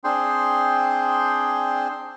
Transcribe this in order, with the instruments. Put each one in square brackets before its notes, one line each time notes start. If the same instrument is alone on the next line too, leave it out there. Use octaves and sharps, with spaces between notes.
[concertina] C4 D4 G#4 G5 C6